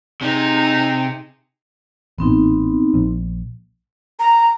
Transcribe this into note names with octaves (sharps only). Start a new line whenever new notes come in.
C3 D#4 G#4
A1 A#2 B3 C4 D#4
A#1
A#5